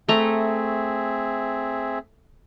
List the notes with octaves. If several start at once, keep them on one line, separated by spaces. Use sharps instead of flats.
A3 C4 G#4 E5 A#5